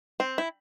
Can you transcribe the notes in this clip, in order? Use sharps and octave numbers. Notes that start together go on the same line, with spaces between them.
C4
E4